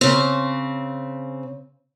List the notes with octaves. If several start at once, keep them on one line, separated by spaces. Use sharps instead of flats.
C#3 C4